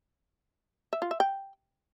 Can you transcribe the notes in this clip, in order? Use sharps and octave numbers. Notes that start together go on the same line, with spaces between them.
E5
F4
E5
G5